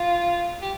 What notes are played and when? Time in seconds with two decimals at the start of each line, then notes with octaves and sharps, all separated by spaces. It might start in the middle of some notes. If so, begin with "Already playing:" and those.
Already playing: F4
0.62 G4